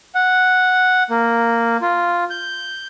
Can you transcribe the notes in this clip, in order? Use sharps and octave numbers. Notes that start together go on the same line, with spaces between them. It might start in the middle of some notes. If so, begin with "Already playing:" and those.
F#5
A#3
F4
G6